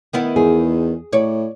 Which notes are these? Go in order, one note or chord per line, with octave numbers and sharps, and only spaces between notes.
D#3 B3 E4
E2 G#4
A2 C#5 D5